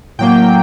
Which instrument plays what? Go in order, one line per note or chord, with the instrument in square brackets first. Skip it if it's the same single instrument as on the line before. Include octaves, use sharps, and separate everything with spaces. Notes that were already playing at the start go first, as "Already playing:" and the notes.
[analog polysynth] A2 F#3 A#3 G5